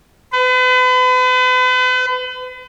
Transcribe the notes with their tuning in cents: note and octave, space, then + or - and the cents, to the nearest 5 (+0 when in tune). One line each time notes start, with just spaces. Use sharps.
B4 +40